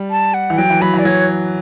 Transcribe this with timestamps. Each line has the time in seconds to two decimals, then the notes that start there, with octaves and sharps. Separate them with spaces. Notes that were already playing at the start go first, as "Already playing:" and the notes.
Already playing: G3
0.10 A5
0.34 F#5
0.50 E3
0.58 F#3 G5
0.70 E3
0.82 F#3 B5
0.94 E3 D5
1.05 F#3 C#5